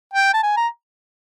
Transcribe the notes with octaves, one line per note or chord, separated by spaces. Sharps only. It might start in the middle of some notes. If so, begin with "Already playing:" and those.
G5
A5
G#5
A#5